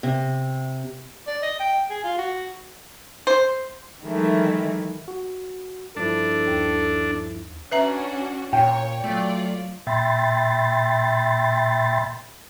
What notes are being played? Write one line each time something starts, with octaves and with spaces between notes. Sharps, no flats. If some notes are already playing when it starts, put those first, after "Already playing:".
C3
D5
D#5
G5
G#4
F4
F#4
C5
D#3 E3 F#3 G#3 A3 E4
F#4
G2 F3 D4 E4 A4
D#2
C#4 D4 F#4 B4 E5 A#5
A#2 C#5 G5
F#3 A3 F4 D5
A#2 E5 G5 B5 C6 A6